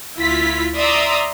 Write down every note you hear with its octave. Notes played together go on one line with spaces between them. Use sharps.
D2 E4 F4 B6
D5 E5 A#5 C6 D#6 E6